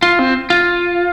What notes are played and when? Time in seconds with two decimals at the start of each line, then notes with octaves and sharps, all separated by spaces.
0.02 F4
0.19 C4
0.50 F4